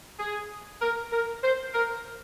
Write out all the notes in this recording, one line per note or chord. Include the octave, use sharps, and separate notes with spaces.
G#4
A#4
A#4
C5
A#4